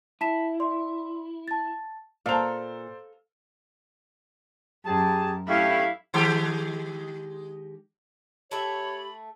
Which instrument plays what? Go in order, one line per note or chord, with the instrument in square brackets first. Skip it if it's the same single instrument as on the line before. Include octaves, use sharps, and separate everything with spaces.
[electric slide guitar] E4 [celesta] A5 B6 E7
[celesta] D5 C6
A5 A6
[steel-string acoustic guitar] A#2 [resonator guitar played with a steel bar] A4 A#5 [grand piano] C5 D5 [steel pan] F5
[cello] F#2 [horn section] G4 G#4 [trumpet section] A5
[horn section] A2 A3 C#4 [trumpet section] D4 G4 [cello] E4 [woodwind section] F5
[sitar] D#3 G#3 G4
[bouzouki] A3 E5 [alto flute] G4 [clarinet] C#5 [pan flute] B5